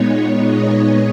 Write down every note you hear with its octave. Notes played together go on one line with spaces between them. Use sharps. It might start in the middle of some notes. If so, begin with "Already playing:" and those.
Already playing: A#2 G#3 B3 D#4 C#5
D#5